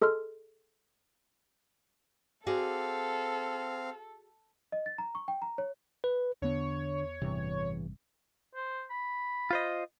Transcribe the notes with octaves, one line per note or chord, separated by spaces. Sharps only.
G#4 A4 D#5 C6 F6
C4 F#4 G#4 A4 D5 F5
D#5
A6
A#5
C#6
G5
A#5
C#5
B4
E2 D3 B3 C#5
A1 E2 G2 C3
C5
B5
F4 C5 D#5